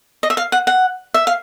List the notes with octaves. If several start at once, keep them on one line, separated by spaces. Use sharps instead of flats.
D#5
E5
F5
F#5
F#5
E5
F5